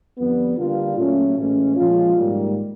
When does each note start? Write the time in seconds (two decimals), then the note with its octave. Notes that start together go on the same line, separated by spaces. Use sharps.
0.17 F2 D3 G3 B3
0.57 D3 G3 A#3 D4 F4
0.97 A#2 F#3 A3 C#4
1.37 A2 E3 G#3 C#4
1.76 A#2 F3 G#3 C#4 F4
2.15 G#2 D#3 G3 A#3